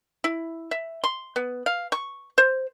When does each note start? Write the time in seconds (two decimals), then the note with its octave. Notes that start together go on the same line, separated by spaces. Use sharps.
0.24 E4
0.71 E5
1.04 C6
1.36 B3
1.66 F5
1.92 C#6
2.38 C5